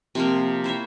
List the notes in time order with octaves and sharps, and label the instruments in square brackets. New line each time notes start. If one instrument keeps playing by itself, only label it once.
[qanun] C3 F3 A#3
E4 C5 C#5 E5